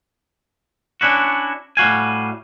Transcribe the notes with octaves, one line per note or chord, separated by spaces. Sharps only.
C#4 D4 E4 F#4
A2 G3 F#4 F5 G#5